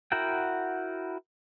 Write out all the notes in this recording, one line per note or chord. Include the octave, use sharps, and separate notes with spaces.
E4 F#4 A#4 F#5 G5